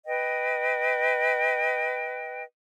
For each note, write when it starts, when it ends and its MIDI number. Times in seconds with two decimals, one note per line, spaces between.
0.06 2.42 71
0.06 2.42 75
0.06 2.42 79